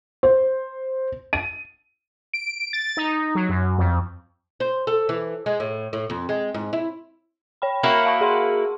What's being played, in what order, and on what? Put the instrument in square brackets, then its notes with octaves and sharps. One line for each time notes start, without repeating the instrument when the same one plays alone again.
[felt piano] C5
D#7
[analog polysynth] D7
A6
D#4
F#3
F#2
F2
[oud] C5
A4
E3
G#3
A2
A2
F2
G#3
G#2
E4
[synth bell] C#5 G5 B5
[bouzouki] A#3 E4 F#4 [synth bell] F6
[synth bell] F5 A5 C#6
G#4 F#5 C6